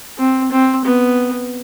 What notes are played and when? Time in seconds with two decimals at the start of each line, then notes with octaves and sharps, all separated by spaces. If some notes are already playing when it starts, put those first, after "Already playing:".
0.19 C4
0.51 C4
0.85 B3